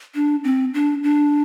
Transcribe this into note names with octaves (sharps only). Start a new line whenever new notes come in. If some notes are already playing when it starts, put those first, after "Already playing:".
D4
C4
D4
D4